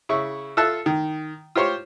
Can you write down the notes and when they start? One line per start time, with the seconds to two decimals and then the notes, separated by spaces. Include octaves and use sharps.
0.09 C#3 E4 C#6
0.57 F4 A4 E5 A5 E6 F#6
0.86 D#3
1.56 F4 G4 C5 C#5